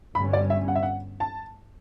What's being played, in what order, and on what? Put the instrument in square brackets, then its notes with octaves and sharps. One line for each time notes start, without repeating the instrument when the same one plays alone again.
[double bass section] G1 G2 D3 G3 C#4 [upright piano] B5
[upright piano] D5
E5
F#5
E5
F#5
A5